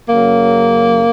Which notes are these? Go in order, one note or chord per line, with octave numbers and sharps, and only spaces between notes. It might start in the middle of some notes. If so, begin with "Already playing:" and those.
F#2 C#3 F#3 A#3